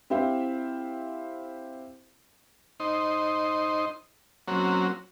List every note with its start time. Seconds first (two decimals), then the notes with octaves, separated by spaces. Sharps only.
0.10 C4 E4 G4 C5 E5 F5
2.80 D#4 C5
4.48 F#3 A#3 C4 C#4 F#4